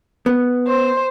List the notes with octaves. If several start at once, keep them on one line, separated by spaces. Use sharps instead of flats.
B3
C5